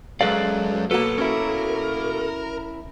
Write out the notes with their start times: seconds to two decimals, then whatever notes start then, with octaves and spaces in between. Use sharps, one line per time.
0.21 F#2 G#3 G#4 A4 B4 D5 F5
0.91 B2 F#3 A#3 A4 B4
1.18 C#4 E4 A#4